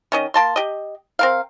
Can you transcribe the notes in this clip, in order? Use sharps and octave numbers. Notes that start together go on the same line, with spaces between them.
D#3 C#4 D#5
A#3 A5 C6
G4 D#5
C4 A#4 F5